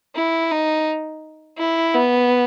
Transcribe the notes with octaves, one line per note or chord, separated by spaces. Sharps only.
E4
D#4
E4
B3